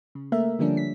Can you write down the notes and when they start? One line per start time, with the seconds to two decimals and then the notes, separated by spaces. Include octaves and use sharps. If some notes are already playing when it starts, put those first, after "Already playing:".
0.15 C#3
0.32 A3 A#3 A#4 E5
0.59 D3 F3 G3 A#3 C#4 D4
0.77 B6